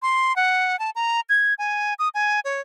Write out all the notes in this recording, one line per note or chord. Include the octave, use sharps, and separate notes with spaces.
C6
F#5
A5
A#5
G#6
G#5
D#6
G#5
C#5